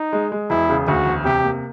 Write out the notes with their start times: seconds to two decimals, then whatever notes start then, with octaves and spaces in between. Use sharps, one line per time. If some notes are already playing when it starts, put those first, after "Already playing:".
Already playing: D#4
0.13 G#3
0.32 G#3
0.50 E1 E4
0.69 C#3
0.87 D2 F#4
1.06 E1
1.25 C3 G4
1.44 A#3